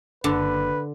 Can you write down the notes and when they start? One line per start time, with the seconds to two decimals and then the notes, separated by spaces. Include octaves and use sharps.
0.24 F#1 D3 B4